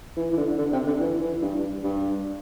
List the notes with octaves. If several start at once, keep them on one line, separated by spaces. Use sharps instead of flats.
E3
E3
D3
D3
C3
D3
E3
E3
G2
G2